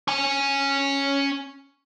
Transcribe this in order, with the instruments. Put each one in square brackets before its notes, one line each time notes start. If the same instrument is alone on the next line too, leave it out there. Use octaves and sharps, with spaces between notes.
[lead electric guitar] C#4 G#5